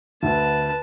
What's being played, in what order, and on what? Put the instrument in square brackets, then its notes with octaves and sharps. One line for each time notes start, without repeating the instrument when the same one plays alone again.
[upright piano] D2 D3 [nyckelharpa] B4 A5